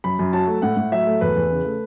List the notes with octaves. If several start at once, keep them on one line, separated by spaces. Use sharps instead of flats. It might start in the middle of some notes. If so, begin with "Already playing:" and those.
F#2 B5
F#2
F#3 A5
A3
A2 F#5
A2
F#3 E5
A3
E2 B4
E2
C#3
A3